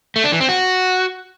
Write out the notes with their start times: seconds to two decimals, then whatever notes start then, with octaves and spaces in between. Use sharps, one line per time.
0.16 A3
0.24 D4
0.32 E3
0.40 C4
0.49 F#4